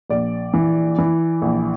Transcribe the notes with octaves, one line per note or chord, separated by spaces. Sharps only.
A#1 D5
E3
E3
A#1